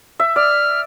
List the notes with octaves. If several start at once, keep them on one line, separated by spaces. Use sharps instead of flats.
E5
D5 F6